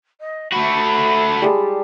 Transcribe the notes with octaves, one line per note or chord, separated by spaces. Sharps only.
D#5
A3 F#4 B5
G3 G#3 A5